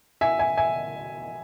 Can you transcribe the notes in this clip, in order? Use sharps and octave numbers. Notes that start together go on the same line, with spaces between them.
E5 G#5
E5 G#5
E5 G#5